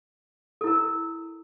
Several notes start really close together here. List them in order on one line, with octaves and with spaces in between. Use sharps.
A4 E4 A#4